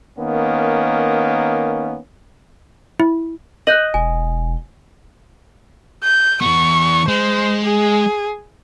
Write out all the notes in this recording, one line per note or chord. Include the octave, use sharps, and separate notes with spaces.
D#3 A#3 B3 C#4
E4
D#5 F#6 G6 F#7
E1 G#5
G6
E3 B3 C#6
G#3 C5
G#4